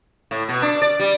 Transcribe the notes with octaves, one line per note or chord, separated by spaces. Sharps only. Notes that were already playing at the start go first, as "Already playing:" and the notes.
A2
B2
D4
D5
G3